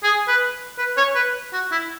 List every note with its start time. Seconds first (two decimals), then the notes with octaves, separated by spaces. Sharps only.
0.03 G#4
0.28 B4
0.78 B4
0.97 C#5
1.15 B4
1.53 F#4
1.71 E4